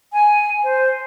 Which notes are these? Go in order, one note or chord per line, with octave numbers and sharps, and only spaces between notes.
G#5
C5